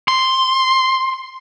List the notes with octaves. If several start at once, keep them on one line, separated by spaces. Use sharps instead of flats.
C6